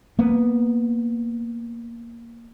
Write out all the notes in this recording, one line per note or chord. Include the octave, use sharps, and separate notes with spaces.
A#3 B3